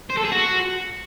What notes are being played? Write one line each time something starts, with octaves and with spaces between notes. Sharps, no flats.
C5
A4
G#4
F#4